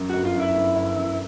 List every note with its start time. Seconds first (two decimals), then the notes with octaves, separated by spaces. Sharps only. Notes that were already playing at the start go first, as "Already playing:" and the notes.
Already playing: F#2
0.10 G1 F#4
0.25 F4
0.35 F#2 E4
0.55 G1
0.76 G1
0.96 F#2